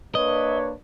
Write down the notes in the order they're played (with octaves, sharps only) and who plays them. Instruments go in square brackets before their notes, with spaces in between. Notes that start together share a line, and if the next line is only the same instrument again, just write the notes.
[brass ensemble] A#3 D4 B4 [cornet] C#5 [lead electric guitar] D#5